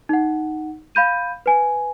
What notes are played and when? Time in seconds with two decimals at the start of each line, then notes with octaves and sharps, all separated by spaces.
0.09 D#4 F#5
0.95 F5 B5 G6 D#7
1.46 B4 G#5